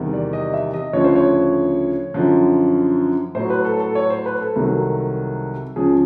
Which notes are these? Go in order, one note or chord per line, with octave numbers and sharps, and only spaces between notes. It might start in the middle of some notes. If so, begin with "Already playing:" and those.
Already playing: E2 C3 D#3 G3
D5
D#5
E5
D#5
D2 C#3 F3 C#5
C5
C#5
F#2 D3 F3
A2 F#3 C5
B4
A4
A4
C#5
C5
B4
A4
C2 C3 D#3 F#3
C#2 C#3 F3 G#4